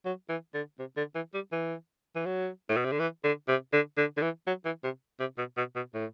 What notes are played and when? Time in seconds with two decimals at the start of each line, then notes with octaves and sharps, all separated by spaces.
0.05 F#3
0.29 E3
0.54 D3
0.79 C3
0.97 D3
1.15 E3
1.34 G3
1.52 E3
2.16 E3
2.26 F#3
2.69 A2
2.77 B2
2.85 C3
2.92 D3
2.99 E3
3.24 D3
3.48 C3
3.73 D3
3.98 D3
4.17 D3
4.22 E3
4.47 F#3
4.65 E3
4.84 C3
5.20 C3
5.38 B2
5.57 B2
5.76 B2
5.94 A2